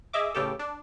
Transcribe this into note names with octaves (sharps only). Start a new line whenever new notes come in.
G#4 D#5 E5 D6
A1 C#3 G4 A4
D4